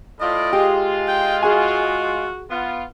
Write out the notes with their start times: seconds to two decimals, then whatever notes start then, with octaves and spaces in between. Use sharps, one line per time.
0.20 A2 F4 D5 D#5
0.53 G#3 F4 G4
1.08 G5
1.43 F#4 G#4 G#5
2.50 B3 F4